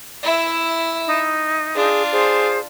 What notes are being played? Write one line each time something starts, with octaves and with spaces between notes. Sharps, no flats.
E4 E5
D#4
D4 F4 G#4
G#4 C5